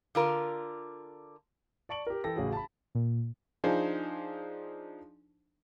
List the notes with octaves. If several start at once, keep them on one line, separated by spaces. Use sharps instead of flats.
D3 F4 A#4
D5 A5 C#6 D7 F#7
G4 A#4
E3 A4 G5 A#6
A1 C#3 F#4 G#4
A5 B5
A#2
F3 D4 D#4 G#4 C5